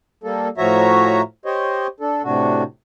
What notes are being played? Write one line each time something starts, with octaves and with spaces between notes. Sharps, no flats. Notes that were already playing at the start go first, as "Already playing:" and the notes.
G3 A#3 A4
A2 F3 F#4 C#5 E5 A#5
G4 C5 C#5 D#5
D4 A4
A2 C3 D4 F#4